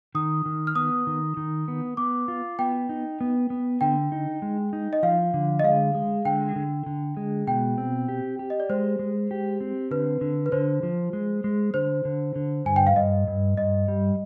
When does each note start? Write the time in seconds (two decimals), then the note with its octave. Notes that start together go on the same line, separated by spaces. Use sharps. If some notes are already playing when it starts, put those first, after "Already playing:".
0.15 D#3 D#6
0.46 D#3
0.67 F6
0.76 B3 D#6
1.07 D#3
1.37 D#3
1.68 B3
1.97 B3 D6
2.28 F4
2.59 B3 G5
2.89 D#4
3.21 B3
3.50 B3
3.81 D3 G5
4.12 D#4
4.42 G#3
4.73 D#4
4.93 D#5
5.03 F3 F5
5.34 D3
5.60 D#5
5.64 G#3 F5
5.95 G#3
6.25 D3 G5
6.56 D3
6.86 D3
7.17 G#3
7.47 B2 G5
7.78 C4
8.09 G4
8.39 G4
8.50 D#5
8.60 D5
8.69 G#3 C5
8.99 G#3
9.31 G4
9.61 C4
9.91 D3 B4
10.21 D3
10.46 B4
10.52 D3 C5
10.83 F3
11.13 G#3
11.44 G#3
11.74 D3 C5
12.05 D3
12.36 D3
12.65 G2 G#5
12.76 G5
12.87 F5
12.96 G2 D#5
13.27 G2
13.57 G2 D#5
13.88 G3